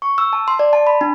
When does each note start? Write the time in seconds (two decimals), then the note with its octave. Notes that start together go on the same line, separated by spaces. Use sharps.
0.02 C#6
0.18 E6
0.33 A5
0.48 C6
0.59 D5
0.73 A5
0.87 B5
1.01 D4